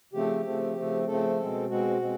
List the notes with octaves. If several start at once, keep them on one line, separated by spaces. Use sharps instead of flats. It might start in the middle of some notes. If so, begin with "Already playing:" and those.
C#3 F3 A3 C4 G4
C#3 F3 A3 C4
C#3 F3 A3 C4
C#3 F3 A3 C4 A4
B2 G#3 C4
B2 G#3 C4 F#4
B2 G#3 C4